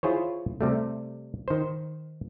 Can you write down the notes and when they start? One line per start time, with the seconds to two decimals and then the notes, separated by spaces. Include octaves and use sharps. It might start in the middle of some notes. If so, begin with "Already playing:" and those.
0.03 E4 F4 G#4 C5 C#5
0.61 C3 G3 A3
1.48 D#3 C5